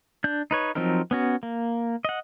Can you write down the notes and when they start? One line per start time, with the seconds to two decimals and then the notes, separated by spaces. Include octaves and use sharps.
0.24 D4 G6
0.51 D#4 B4 C#5
0.75 F3 F#3 C4 D#4 A#4
1.11 B3 C#4 F#4
1.43 A#3
2.05 D#5 F#5